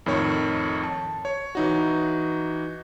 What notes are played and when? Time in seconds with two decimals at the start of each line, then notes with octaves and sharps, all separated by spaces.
0.06 F2 A2 D#3 C#5
0.83 A5
1.25 C#5
1.55 E3 D#4 F#4